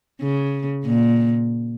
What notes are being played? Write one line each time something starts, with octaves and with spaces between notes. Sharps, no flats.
C#3
A#2